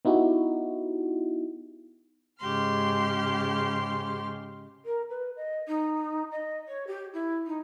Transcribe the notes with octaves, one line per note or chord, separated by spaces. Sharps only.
B3 D#4 E4 F#4 G4
G#2 C#3 G4 C6 F6
A#4
B4
D#5
D#4
D#5
C#5
G4
E4
D#4